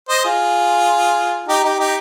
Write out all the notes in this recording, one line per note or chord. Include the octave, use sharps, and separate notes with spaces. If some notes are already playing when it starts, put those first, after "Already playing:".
C5 D#5
F4 G#4
D#4 G4
D#4 G4
D#4 G4